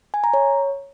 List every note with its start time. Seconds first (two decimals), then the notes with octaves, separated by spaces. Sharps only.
0.14 G#5
0.24 A#5
0.34 C#5